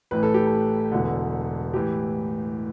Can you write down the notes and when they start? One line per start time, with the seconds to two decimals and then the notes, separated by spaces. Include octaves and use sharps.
0.11 A1 A2 E3 B4
0.23 A4
0.34 G4
0.47 A4
0.92 E1 E2 D3
1.74 A2 E3 G4